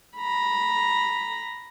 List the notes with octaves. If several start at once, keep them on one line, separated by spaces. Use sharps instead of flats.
A#5 B5